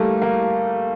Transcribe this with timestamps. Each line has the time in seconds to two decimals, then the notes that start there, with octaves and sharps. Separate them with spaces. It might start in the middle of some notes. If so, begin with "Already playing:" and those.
Already playing: G3 A3 A#3
0.22 A#3